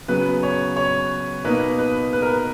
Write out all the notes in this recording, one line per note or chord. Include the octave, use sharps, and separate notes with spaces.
C#3 F#3 B3 B4
C#5
C#5
B2 A#3 D#4 B4
B4
B4
A#4
B4